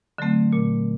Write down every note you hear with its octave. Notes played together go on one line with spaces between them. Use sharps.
D3 F#3 A3 C4
A#2